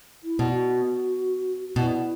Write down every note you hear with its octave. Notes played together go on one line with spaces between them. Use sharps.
E4
B2
F#4
B2 E4